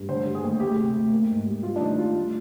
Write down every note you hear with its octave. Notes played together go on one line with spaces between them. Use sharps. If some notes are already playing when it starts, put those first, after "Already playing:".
Already playing: G2
D3 C5
G3
G#4
D#2
D2 G4
C3
D2
A#3
G#2
G3
G3 F4
D4
D#3 D#4
G3 F4
D2